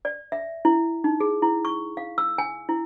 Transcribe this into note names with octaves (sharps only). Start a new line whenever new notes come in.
D5
E5
E4
D#4
G#4
E4
C#6
F5
E6
G#5
E4